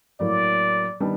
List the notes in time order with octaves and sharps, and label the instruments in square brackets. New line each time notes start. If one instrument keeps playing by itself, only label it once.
[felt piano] A2 F#3 A#3 [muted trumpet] D5
[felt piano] D#3 G3 B3 D4